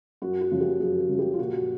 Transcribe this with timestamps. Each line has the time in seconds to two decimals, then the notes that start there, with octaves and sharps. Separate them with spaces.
0.22 F#2 F#4
0.41 F#4
0.51 C#3 F3
0.60 G4
0.80 F#2 G#4
1.00 G#4
1.09 C#3 F3
1.19 G4
1.33 F4
1.39 A#2 F#4